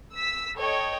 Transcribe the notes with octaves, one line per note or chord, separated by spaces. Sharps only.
E6 B6
A4 C#5 D#5 G5